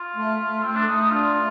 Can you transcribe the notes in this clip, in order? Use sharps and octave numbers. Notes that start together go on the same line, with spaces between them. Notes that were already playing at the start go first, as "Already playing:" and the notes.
Already playing: F4
A3
A3
A3 C4
D4
A3 D#4
D#4
D4 F4
A3